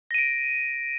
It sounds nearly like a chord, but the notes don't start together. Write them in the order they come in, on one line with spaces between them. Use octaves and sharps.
A#6 D#7 D7